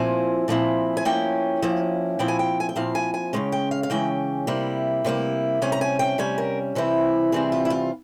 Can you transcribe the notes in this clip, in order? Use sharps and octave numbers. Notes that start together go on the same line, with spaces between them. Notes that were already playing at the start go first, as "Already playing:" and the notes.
Already playing: A#2 F3 C4 E4 G#5
A#2 F3 C4 E4
G#5
F3 A#3 C#4 E4 G5
F3 A#3 C#4 E4
A#2 F3 C4 E4 G5
G#5
G5
G#5
G5
A#2 F3 C4 E4 F5
G#5
G#5
C#3 E3 G#3 C#4 G5
G5
F5
F5
C#3 E3 G#3 C#4 G5
C3 G3 A#3 E4
C3 G3 A#3 E4
C3 G3 C#4 G#5
A#5
G#5
G5
C3 G3 C#4 G#5
A#4
C3 E3 G3 C4 E4
C3 E3 G3 C4 E4 G#4
F4
E4
F4